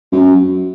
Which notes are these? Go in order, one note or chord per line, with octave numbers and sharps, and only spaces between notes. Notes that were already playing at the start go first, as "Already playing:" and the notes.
F#2